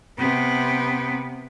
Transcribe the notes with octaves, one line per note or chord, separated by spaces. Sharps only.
C3 B3